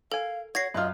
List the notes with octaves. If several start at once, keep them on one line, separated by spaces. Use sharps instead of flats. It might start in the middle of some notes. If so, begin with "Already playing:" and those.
A4 A#4 F5 G#5
F#4 C#5 G#6 A#6 C7
F#2 F4 B4 D#5 F6